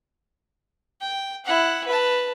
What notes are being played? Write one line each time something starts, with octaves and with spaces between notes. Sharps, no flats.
G5
E4 F#5
B4 A5